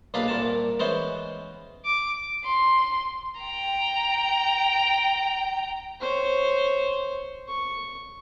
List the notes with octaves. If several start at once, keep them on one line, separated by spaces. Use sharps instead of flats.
B1 A#3 D4 G#4 F5 B5
C2 A#2 A#3 A5
E3 G#3 B3 C#4 C5
D6
C6
G5 A#5
C5 C#5
C#6